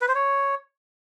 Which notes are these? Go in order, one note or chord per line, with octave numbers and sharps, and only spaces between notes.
B4
C5
C#5